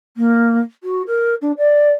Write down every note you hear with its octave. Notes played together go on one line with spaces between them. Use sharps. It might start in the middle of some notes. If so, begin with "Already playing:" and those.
A#3
F#4
A#4
D4
D5